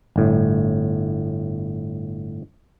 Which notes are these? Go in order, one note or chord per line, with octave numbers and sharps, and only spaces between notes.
G1 A2